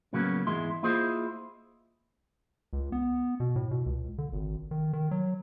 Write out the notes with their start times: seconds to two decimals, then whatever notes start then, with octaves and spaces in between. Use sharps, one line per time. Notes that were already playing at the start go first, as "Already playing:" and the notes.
0.13 A2 C#3 F#3 A#3 B3 C#4
0.47 E2 G#2 G#3 E4 C6
0.83 A#3 E4 F4 G#4 C5 D#5
2.73 C#2
2.92 B3
3.40 B2
3.56 A2
3.71 B2
3.86 C#2
4.18 D3
4.32 G#1
4.71 D#3
4.93 D#3
5.11 F#3